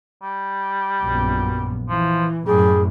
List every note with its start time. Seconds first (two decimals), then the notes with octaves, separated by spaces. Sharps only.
0.22 G3
1.03 A#1 F#2 B3
1.89 E3 F3
2.47 F#2 A2 G3 G#4